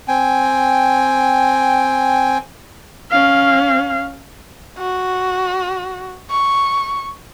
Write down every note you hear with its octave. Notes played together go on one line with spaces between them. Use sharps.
C4 G5 G#5
C#4 F5
F#4
C#6